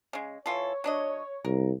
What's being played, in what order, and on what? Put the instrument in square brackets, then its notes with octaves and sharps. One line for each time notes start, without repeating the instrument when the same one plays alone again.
[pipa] C#3 G#3
[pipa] E3 F4 A4 [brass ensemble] C#5
[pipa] F#3 D4 D#5
[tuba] C2 [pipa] A#4